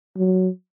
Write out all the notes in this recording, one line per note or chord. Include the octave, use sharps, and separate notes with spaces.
F#3